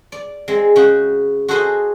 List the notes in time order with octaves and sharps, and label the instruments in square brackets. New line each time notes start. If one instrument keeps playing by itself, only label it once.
[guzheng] D5
G#3 C4
C#3 F#4 G5
F#4 G#4 A4 C5 D#5 G#5